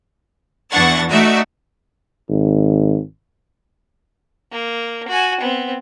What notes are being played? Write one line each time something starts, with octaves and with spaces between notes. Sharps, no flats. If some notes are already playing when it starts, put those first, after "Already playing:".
E2 E3 D4 F#5 C#6 A6
A3 D#4 F#4 D5 E5
G#1
A#3
F#4 G#5
B3 C4